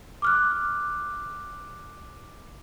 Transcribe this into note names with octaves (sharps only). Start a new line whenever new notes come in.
D6 F6 F#6